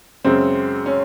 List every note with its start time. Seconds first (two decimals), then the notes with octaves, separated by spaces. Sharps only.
0.25 F#2 C#3 G#3 C4
0.86 C#4